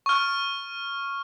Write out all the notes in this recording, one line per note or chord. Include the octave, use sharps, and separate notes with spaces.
C#6 F6